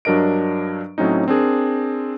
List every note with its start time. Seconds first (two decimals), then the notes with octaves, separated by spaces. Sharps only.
0.05 G2 F#3 D4 A#4 D#5 D7
0.98 A2 F#3 C4 C#4 D#4
1.28 C4 D4 G#4 A#4